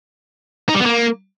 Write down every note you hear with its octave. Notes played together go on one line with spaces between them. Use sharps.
D#4
G3
B3
A#3